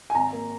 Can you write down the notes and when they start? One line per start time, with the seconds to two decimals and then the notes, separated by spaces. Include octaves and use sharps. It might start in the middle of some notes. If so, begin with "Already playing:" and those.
0.10 G#5
0.15 G#1 A#5
0.33 A#3